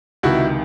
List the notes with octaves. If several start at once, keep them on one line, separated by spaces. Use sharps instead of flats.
C#2 C3 D#3 E4 F#4